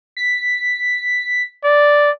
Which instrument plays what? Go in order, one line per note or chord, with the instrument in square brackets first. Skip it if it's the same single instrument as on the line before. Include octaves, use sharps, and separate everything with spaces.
[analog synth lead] B6
[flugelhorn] D5